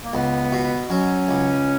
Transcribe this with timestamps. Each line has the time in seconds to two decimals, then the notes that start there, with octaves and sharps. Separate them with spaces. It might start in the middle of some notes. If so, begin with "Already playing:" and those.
0.03 A#3
0.13 C#2 B3
0.52 B2
0.90 F#3 C#4
1.28 C#2